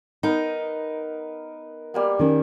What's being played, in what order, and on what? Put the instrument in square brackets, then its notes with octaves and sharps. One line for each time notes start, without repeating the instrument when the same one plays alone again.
[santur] B3 A#4 B4 [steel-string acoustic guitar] D#4
[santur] G3 A#3 B3
[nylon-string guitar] D#3 C#4